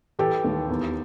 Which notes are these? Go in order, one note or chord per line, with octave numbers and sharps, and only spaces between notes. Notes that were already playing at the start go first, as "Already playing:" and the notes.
E3 G4 A4
D#2
E2